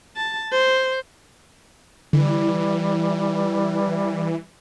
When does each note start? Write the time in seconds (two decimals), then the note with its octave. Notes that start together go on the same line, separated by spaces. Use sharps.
0.16 A5
0.52 C5
2.13 D3 E3 G3